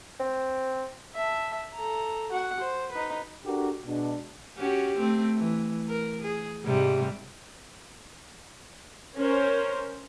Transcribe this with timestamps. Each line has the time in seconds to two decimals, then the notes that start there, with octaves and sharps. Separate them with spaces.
0.20 C4
1.15 E5 A5
1.74 A4 A#5
2.31 F#4 F#5
2.59 C5
2.91 D#4 B4
3.45 D4 F#4 G4 A4 A#4
3.85 B2 G#3 D4
4.58 C#4 F#4 G4
4.97 A3 C4
5.38 E3
5.89 A#4
6.22 G#4
6.64 G#2 C3 G3
9.16 C#4 A#4 C5